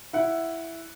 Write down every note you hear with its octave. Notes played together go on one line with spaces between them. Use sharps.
E4 F#5